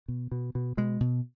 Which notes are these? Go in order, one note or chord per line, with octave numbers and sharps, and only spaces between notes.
B2
B2
B2
B2 G#3
B2